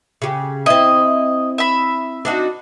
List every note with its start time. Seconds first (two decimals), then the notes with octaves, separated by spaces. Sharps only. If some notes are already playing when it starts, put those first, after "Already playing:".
0.22 C#3 G4
0.66 C4 E4 D#5
1.58 E5 B5
2.25 D4 D#4 F#4